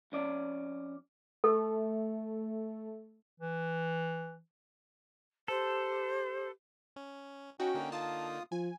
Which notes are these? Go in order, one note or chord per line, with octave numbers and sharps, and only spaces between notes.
F2 C#4 D5
A3 A4
E3
G4 A4 C5
C#4
C#4 D#4 F#4 G5
D3 A#3 D#4
F4 A5 D#6
F3 G#5